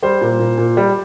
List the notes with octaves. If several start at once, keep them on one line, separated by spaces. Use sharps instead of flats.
G3 C5
A#2
A#2
A#2
G3